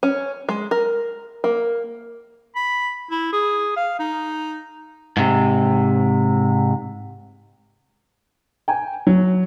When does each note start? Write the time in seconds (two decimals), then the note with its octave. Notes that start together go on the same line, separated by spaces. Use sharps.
0.03 C#4
0.49 G#3
0.71 A#4
1.44 A#3
2.56 B5
3.11 E4
3.33 G#4
3.76 F5
3.99 D#4
5.17 G#2 C3
8.68 G5 G#5
9.07 F#3